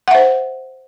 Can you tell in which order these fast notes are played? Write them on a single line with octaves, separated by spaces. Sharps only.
F#5 E5 C5